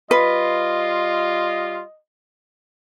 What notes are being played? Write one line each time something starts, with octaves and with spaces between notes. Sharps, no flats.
G3 F4 B4 D#5